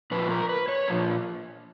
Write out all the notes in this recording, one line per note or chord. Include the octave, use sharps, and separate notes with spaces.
A#2 F3 B4
A#4
B4
C#5
A#2 F3